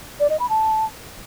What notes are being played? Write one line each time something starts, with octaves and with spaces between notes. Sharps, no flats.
D5
D#5
B5
A5